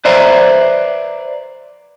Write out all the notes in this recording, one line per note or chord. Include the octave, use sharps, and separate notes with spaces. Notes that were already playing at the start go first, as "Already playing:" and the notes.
B4 C5 D5 E5 A#5